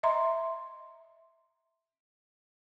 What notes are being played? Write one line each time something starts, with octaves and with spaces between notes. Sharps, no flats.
D#5 E5 A#5 C6